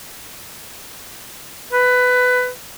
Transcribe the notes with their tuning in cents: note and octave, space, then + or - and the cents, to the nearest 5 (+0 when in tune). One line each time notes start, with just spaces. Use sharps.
B4 +15